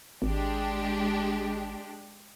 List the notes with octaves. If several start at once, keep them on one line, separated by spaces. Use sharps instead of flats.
G#1 G#3 D4 G4